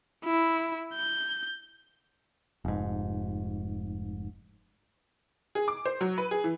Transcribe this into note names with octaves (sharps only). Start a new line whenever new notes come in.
E4
G6
F1 G#2
G#4
D6
C5
F#3
B4
G#4
E3